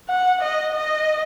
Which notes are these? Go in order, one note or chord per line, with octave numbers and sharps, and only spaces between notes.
F#5
D#5
D#5